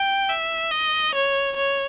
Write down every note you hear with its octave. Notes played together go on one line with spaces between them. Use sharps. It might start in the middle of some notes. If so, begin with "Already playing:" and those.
Already playing: G5
E5
D#5
C#5
C#5